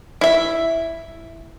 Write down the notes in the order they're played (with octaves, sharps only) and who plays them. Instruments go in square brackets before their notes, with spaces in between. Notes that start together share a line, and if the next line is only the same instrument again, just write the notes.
[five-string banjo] E4 E5